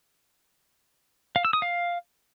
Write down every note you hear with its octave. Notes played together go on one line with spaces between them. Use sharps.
F5
E6
D#6
F5